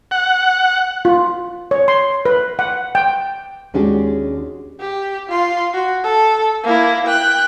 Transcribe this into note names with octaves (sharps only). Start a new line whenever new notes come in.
F#5
F4
C#5
C6
B4
F#5
G5
D#2 G#3 C#4 D4 F#4 G4
G4
F4 C6
F#4
A4
A#3 E4
G5 F#6